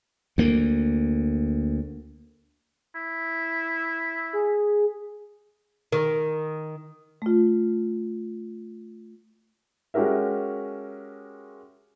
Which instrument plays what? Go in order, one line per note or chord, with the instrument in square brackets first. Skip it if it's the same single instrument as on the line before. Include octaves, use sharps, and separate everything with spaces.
[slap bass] D2 A#3
[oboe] E4
[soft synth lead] G#4
[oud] D#3
[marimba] A3 F4
[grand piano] G#3 C#4 F#4 G4 A#4 E5